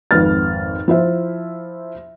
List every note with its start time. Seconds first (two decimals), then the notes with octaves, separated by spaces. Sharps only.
0.11 G#1 F2 B4 F6 A6
0.88 F3 E4 C5 E5